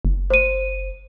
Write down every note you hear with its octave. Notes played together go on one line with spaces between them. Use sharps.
F#1
C5 D#7